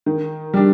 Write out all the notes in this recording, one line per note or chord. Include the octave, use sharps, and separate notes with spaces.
D#3
G3 D4